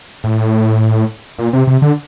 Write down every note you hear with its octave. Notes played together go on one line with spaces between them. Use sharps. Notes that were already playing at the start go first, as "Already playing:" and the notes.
A2
A#2
C3
C3
D3